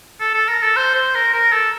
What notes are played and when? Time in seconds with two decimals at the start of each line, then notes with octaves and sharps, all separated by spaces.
0.20 A4
0.34 A4
0.49 A#4
0.63 A4
0.77 C5
0.95 C5
1.15 A#4
1.33 A#4
1.52 A4